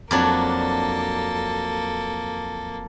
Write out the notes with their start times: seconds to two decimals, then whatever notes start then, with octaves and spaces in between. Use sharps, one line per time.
0.11 F2 F#3 A#3 D4 A4